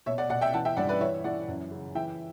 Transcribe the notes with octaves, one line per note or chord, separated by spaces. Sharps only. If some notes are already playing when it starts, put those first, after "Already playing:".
B2 C#5 E5
D5 F#5
B2 D5 F#5
E5 G5
E3 F#5 A5
E5 G5
G2 D5 F#5
B4 D5
E3 C#5 E5
E3 D5 F#5
F#2
C#3
E3 E5 G5